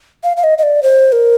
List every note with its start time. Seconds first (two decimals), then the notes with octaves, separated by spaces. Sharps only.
0.24 F5
0.37 F5
0.44 D#5
0.58 D#5
0.63 D5
0.83 C5
1.12 A#4